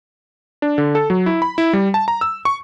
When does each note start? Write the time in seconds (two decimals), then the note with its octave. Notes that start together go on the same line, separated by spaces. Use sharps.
0.62 D4
0.78 D3
0.95 A4
1.10 F#3
1.26 E4
1.42 B5
1.58 E4
1.73 G3
1.94 A5
2.08 A#5
2.21 E6
2.45 C#6